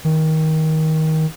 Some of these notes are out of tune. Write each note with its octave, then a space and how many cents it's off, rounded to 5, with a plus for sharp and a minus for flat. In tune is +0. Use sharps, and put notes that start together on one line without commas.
D#3 +20